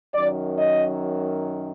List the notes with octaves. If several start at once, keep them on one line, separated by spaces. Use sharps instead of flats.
F#2 D#3 F#3 D5
D#5